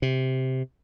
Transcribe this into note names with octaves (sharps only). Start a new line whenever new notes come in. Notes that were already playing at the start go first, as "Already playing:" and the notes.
C3